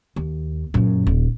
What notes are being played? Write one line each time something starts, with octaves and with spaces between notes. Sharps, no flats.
D#2
F#2 A#2
D#1